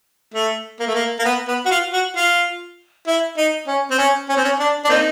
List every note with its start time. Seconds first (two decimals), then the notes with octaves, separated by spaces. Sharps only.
0.34 A3
0.80 A#3
0.87 A3
0.94 A#3
1.19 A#3
1.25 B3
1.48 B3
1.66 F#4
1.71 F4
1.93 F#4
2.16 F4
3.07 E4
3.38 D#4
3.68 C#4
3.91 C4
3.98 C#4
4.29 C#4
4.37 C4
4.44 C#4
4.59 D4
4.85 D4
4.89 A#3 C4 D#4